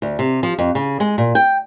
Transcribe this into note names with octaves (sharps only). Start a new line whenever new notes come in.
D2
C3
F3
F2
C#3
G#3
A#2
G5